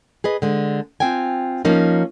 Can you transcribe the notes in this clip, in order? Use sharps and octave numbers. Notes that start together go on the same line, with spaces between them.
G#4 B4 D#5
D3 G#3
C4 F4 G5 G#5
F3 A#3 C#4 D#4